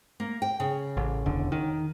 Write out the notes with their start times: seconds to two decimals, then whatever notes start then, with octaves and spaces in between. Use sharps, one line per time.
0.20 A#3
0.42 G5
0.60 C#3
0.97 A1
1.26 E1 D3
1.52 D#3